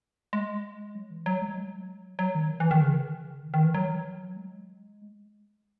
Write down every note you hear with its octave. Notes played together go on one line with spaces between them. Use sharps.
G#3
F#3
E3
F#3
G#3
F#3
F#3
D#3
E3
D#3
C#3
D#3
D#3
E3
F#3
G#3